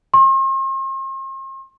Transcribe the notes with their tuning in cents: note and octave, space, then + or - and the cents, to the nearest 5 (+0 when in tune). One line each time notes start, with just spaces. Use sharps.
C6 +45